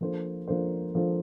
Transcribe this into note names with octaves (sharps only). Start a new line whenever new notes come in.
F3 A#3 D4 A4 C5
F3 A#3 D4 A4 C5
F3 A#3 D4 A4 C5